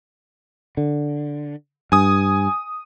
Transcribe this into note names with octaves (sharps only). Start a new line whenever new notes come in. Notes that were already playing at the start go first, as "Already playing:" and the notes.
D3
G2 G#5 D#6